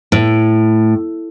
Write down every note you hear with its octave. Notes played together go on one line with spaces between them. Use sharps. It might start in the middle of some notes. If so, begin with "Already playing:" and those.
A2